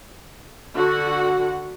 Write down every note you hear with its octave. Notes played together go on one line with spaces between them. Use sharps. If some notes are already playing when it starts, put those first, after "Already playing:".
D3 F#4 F#5